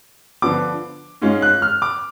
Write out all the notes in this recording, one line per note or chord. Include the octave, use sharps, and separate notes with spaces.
D3 F3 B3 D6
G#2 G#3 C#4 F4
F#6
F6
D6